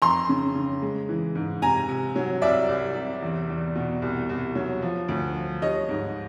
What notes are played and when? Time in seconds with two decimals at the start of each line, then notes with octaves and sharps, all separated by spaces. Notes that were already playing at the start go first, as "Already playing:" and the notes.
0.02 F2 A#5 C6
0.29 C#3
0.55 C#3
0.82 G#3
1.09 E3
1.35 G#2
1.62 C3 G#5 A#5
1.89 C3
2.16 F#3
2.42 C2 D5 E5
2.69 C2
2.95 C3
3.22 E2
3.49 E2
3.75 B2
4.02 C2
4.29 C2
4.55 F#3
4.82 F3
5.08 D2
5.35 F3
5.62 G3 C#5 D#5
5.89 G#2